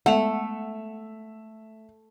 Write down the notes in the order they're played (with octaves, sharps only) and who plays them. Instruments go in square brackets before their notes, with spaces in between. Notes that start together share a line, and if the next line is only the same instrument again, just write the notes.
[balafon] G#3 B3 [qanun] A3 [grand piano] E5 F7 [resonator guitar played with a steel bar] F#5